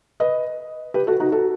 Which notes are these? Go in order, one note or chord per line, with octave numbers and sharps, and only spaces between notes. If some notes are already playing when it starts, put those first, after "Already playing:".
B4 D#5
G4 B4
F#4 A4
D#4 F#4
F#4 A4